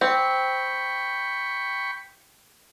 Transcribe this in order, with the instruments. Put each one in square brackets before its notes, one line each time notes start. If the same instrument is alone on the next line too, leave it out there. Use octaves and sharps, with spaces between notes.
[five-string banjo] C4 [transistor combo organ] G5 B5 C#6